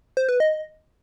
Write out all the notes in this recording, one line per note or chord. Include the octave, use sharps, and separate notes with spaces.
C5
B4
D#5